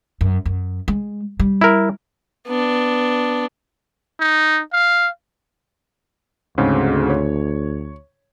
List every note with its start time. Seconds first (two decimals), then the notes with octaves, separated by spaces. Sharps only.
0.21 F#2
0.46 F#2
0.88 G#3
1.40 G3
1.61 E4 A#4
2.47 B3 D4
4.20 D#4
4.73 F5
6.58 D2 G#2 C#3 C4
7.10 C#5